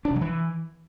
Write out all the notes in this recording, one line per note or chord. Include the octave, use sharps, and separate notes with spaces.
D4
C3
F#3
E3